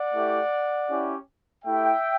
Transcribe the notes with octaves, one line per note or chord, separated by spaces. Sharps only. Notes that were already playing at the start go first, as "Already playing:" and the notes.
Already playing: D5 F#5
A3 E4 G4
C#4 E4 G4
A3 E4 G4 E5 G5